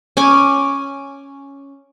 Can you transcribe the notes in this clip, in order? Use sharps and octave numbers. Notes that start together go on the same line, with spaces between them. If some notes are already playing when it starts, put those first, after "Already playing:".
C#4 G#5 D6